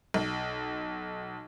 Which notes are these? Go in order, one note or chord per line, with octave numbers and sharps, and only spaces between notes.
B1